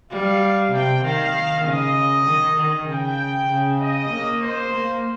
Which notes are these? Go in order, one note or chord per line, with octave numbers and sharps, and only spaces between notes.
G3 F5
C3 G5
D#3 F5
C#3 D#5
D#3
D#3
C#3 G5
C#3
D#5
A#3
C5
A#3